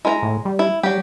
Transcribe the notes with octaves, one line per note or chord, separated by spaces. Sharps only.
G#3 E4 A#4 A#5
A2
G3
E4
F#3 G3 G4